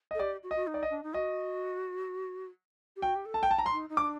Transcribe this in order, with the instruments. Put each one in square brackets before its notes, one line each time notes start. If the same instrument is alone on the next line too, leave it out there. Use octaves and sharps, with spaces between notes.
[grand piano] D#5
[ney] A4
[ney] G4 [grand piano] D5
[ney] F#4
[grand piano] D#5
[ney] F#4
D#4
[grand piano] D5
D#5
[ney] D4
D#4
[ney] F#4 [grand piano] D#5
[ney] G4
[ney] F#4 [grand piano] G5
[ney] G4
A4
[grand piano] A5
G5
A5
A#5
C6
[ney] D#4
D#4
[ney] D4 [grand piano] D6